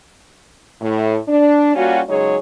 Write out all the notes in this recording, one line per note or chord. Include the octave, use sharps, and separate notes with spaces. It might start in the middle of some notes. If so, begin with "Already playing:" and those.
A2
D4
G3 A#3 C#4 F4 F#4
C#3 F#3 G#3 D#4 G#4 C#5